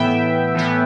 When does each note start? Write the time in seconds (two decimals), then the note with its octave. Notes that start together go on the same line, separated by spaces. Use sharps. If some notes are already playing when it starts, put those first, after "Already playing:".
Already playing: A2 E3 B3 E5 G5
0.54 A2 E3 B3